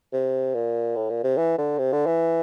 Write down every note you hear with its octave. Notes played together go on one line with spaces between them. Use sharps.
C3
A#2
A2
A#2
C3
E3
D3
C3
D3
E3